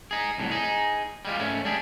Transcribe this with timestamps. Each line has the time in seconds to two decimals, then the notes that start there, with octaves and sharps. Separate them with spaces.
0.11 D#4 G#4
0.38 C2 A2 D3 F#3
0.51 D#4 G#4
1.25 G3 G#3 F4
1.39 G#2 A3 C#4
1.65 G3 D4 G#4